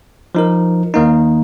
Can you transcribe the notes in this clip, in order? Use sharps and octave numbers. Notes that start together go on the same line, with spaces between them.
F3 D#4 A#4
D#2 D#3 A#3 D#4